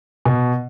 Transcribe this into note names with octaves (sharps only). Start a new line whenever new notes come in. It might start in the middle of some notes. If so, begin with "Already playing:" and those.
B2